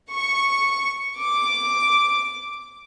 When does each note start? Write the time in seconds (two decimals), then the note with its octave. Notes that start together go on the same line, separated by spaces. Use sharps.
0.13 C#6
1.20 D6